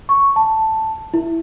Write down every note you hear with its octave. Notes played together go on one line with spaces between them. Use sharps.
C#6
A5
E4